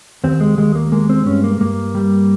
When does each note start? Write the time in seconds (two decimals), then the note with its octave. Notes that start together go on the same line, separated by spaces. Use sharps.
0.24 D#2 C4
0.40 G#3
0.58 D#2 G#3
0.75 A#3
0.92 G#3 A#3
1.09 C4
1.26 G2 C#4
1.44 A#3
1.61 G2 A#3
1.95 G3